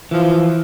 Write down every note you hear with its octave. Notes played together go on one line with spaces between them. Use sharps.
E3 F3